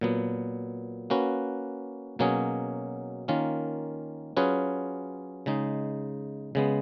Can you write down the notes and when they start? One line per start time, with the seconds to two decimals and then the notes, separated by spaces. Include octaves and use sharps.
0.01 A#2 F#3 B3
1.10 A#3 C#4 F#4 B4
2.19 B2 F#3 A#3 C#4 G#4
3.28 D#3 A#3 C#4 F4
4.37 F#3 C#4 F4 G#4 B4
5.46 C#3 G#3 D#4
6.55 C#3 G#3 B3